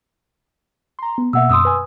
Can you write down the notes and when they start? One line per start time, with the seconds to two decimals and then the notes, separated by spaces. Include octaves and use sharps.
0.99 A#5 C6
1.18 B3
1.33 B2 A#3 E5 F#5 E6
1.50 F#2 C6 D#6 E6
1.65 B4 G#5